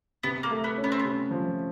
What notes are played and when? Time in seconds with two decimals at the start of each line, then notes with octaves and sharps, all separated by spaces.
0.23 C3 B3
0.43 A#3
0.51 A3
0.64 B3
0.78 C#4
0.84 B3
0.92 C4
0.99 C3 B3
1.31 F3